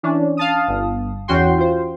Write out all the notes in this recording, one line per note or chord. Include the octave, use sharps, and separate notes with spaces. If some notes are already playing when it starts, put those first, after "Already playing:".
E3 C#4 D4
F5 A5 D#6
G1
E2 E3 C#4 F#4 G5 C6
F4 C5